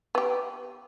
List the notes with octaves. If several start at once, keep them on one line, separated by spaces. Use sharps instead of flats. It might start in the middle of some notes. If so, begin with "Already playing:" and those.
B3 G4